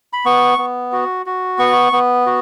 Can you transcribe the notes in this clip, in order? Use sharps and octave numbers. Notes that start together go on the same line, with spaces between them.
B5
B3 C#6
B3
F#4
F#4
B3 C#6
B3
F#4